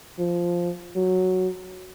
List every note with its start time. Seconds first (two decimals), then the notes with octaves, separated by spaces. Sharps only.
0.19 F3
0.96 F#3